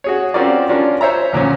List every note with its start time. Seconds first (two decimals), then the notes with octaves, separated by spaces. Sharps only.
0.04 F#4 G#4 C#5
0.34 C4 C#4 F4 F#4 A#4 D5
0.69 C#4 D4 F4 A#4
1.01 C5 C#5 E5 A#5
1.33 D2 A#2 F3 C#4